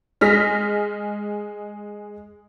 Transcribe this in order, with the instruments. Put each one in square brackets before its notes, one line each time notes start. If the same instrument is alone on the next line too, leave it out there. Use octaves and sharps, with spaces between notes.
[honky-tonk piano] G#3 F6 A#6 B6